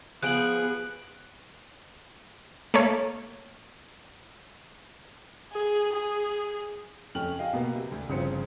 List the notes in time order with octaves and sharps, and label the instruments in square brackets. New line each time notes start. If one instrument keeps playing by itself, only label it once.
[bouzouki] F3 G#4 [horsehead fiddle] B3 [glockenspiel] F#6 D7 F#7
[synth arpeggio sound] A3 A#3 C#5
[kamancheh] G#4
G#4
[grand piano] F2 A3 C#4 G5 F6 F#7
G#4 D#5 F5 G5
B2 A#3 B3
C3
D2
G1 C#3 F3 C4 C#7